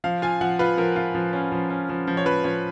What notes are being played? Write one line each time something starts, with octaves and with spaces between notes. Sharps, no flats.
F3 F5
F4 G#5
F3 F#5
F4 B4
F3 A#4
F4
F3
C#4
F3
C#4
F3
F3
C#5
F3 B4
F3 C#5